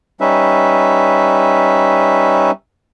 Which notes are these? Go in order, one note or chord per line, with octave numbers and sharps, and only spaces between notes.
G3 C#4 D#4 B4 E5